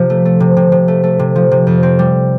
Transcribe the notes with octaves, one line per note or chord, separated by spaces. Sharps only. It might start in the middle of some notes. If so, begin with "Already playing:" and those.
Already playing: C3 F3
A3
A3
C3
C3
C3
A3
A3
C3
F3
C3
F2
C4
G3